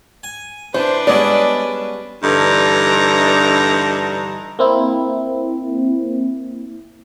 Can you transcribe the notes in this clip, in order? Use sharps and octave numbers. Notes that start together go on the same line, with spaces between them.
G#5
E3 D4 B4 C5
G3 G#3 B3 C#4 D5
G2 D3 E3 D#4 A5 A#5
A#3 C4 E4